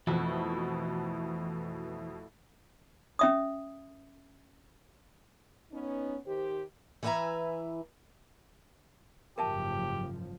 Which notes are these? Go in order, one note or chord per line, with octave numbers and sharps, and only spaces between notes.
F2 B2 E3 A3 E4 F#4
C#4 E5 D#6
B3 C#4 D#4
D#3 G4 C5
E3 E4 B4 E5 G#5 A#5
F#1 G#2 F3 G4 A#4 E5 A5